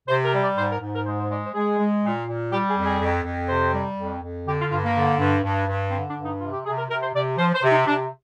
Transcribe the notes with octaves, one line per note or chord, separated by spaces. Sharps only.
C3 C5
A#4
G3
D5
G#2 C5
A#4
G#2
A#4
G#3 C5
C5
G#3 D5
C5
G#3 G#4
G#3
A#2
A#2
G3 G4
G#4
F2
G#4
F2
F2
C3 C5
G3
F2
F2
D3 G4
F4
G2 F4
A#3
D3
G2
G2
G2
D3 C4
D4
G2
D#4
C3 F4
G4
C3 G#4
A#4
C3 A#4
C5
C3 D5
F3 C5
C5
C3
D#4
C3 D4